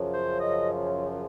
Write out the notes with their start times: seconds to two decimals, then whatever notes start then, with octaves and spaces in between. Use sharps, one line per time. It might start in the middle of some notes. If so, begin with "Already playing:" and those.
Already playing: F#2 C#3 F3
0.14 C5
0.40 D#5